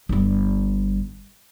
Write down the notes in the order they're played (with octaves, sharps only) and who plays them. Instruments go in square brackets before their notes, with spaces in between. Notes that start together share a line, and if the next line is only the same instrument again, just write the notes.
[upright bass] G1 G2